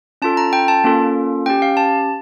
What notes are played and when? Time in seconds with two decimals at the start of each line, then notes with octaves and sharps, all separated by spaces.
0.22 C#4 F4 A4 A5
0.37 A#5
0.53 G5
0.68 A5
0.84 A#3 C#4 F4 A4
1.46 C#4 G5
1.50 G4
1.62 F5
1.77 A5